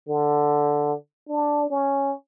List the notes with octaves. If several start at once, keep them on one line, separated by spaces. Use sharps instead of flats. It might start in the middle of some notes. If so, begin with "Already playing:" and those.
D3
D4
C#4